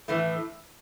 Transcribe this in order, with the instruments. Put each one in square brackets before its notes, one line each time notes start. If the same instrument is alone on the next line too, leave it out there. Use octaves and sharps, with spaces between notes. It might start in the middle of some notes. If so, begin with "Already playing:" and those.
[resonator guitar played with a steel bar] A2 E3 A3